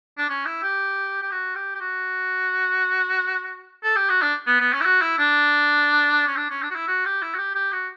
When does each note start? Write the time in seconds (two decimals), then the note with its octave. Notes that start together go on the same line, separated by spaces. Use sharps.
0.18 D4
0.29 C#4
0.45 E4
0.63 G4
1.22 G4
1.31 F#4
1.55 G4
1.75 G4
1.81 F#4
3.84 A4
3.96 G4
4.10 F#4
4.22 D4
4.47 B3
4.60 B3
4.73 C#4
4.80 E4
4.85 F#4
5.02 E4
5.18 D4
6.27 C#4
6.37 D4
6.50 C#4
6.63 D4
6.70 F#4
6.75 E4
6.88 F#4
7.05 G4
7.22 E4
7.34 F#4
7.38 G4
7.55 G4
7.72 F#4